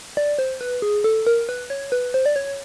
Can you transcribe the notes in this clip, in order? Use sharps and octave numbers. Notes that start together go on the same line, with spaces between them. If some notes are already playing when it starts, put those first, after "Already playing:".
D5
C5
B4
G#4
A4
A#4
B4
C#5
B4
C5
D5
C#5